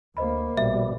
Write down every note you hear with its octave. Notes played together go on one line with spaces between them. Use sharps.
D2 A#3 C5 D#5 B5
A#1 B2 G3 E5